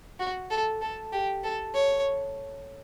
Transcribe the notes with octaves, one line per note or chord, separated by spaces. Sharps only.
F#4
A4
A4
G4
A4
C#5